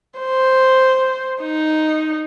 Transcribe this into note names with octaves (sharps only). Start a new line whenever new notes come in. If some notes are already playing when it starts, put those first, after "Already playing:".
C5
D#4